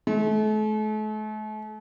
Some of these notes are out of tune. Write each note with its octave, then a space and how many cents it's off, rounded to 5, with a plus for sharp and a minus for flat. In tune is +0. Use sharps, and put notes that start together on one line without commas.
A3 -40